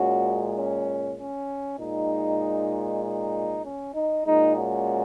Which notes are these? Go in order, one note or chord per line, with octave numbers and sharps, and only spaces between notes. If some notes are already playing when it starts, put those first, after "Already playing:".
Already playing: A#2 G#3 C#4 F#4
C#4
C#4
A#2 G#3 D#4
D#4
C#4
D#4
A#2 G#3 D#4
C#4 F#4